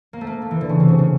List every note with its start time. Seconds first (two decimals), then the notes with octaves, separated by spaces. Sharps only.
0.13 A#3
0.21 A3
0.27 A#3
0.42 A3
0.51 E3
0.61 D3
0.69 C#3
0.80 C3
0.89 C#3
0.99 C#3